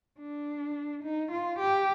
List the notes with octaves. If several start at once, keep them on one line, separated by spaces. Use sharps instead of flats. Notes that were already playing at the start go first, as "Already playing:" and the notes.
D4
D#4
F4
G4